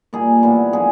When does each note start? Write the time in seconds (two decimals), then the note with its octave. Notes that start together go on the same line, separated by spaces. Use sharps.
0.13 A#2 G3 A#3 G#4
0.43 A2 E3 G3 B3
0.73 D3 F3 A#3 G#4